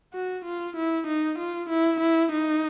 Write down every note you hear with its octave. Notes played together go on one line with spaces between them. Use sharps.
F#4
F4
E4
D#4
F4
E4
E4
D#4